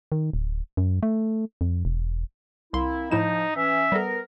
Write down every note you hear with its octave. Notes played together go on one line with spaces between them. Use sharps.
D#3
D1
F#2
A3
F2
E1
C2 A#3 C4 E4 C6
A2 F3 D#4 E4 E7
E3 C#4 E5
G3 B3 A4 A#4